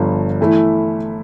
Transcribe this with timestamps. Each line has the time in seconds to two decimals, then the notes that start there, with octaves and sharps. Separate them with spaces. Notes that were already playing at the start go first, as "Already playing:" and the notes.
Already playing: G1 G2 F3
0.41 E3 A3 E4